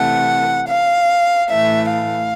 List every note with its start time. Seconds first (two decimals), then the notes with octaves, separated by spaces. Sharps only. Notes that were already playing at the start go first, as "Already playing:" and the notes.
Already playing: C3 E3 A3 F#5
0.67 F5
1.50 A2 E3 A3 E5
1.91 F5